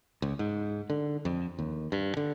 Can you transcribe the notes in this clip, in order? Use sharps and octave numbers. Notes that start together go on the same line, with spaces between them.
C#2
G#2
D3
F2
D#2
G2
D3